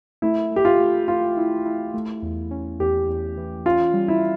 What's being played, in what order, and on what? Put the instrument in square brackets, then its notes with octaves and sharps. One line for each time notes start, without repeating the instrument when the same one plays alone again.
[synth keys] A3 [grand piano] E4
[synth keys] A3 [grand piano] G4
[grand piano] F4
[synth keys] A3
[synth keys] A3 [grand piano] F4
[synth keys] E4
E4
A3
E2
C#4
[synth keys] E2 [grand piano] G4
[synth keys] E2
E3
[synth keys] C#4 [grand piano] F4
[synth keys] G3
[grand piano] E4